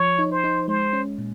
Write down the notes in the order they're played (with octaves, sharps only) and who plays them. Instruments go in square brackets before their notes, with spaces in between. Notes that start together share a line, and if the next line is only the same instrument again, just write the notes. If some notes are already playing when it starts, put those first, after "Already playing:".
Already playing: [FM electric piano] F3 [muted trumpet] C#5
[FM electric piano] D#4
[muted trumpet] C5
[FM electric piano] D#4
[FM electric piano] G#3 [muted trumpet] C5
[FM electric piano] C#4
A#2